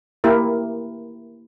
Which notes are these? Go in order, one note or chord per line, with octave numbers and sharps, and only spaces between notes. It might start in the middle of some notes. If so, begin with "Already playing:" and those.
A#3 E4 G4 A#4